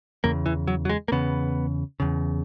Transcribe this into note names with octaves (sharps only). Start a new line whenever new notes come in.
E2 C#3 A#3
E3
F#3
F#3
G#3
A#3
E2 C#3 B3
E2 C#3